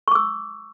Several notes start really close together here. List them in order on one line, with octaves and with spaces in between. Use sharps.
C#6 D6 E6